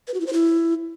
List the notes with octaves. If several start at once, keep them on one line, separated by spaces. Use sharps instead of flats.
B4
F#4
E4
C5
E4